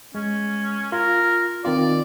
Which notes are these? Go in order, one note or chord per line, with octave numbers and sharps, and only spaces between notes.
G#3 C#4
F4 A#4
D#3 C4 F4 D5